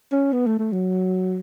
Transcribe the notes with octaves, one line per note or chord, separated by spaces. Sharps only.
C#4
B3
A3
A3
F#3